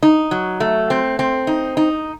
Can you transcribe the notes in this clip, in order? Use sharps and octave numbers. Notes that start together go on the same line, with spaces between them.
D#4
F#3
A3
C4
C4
D#4
D#4